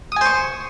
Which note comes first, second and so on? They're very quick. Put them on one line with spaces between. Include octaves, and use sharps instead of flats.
D#6 G#5 C5 C#6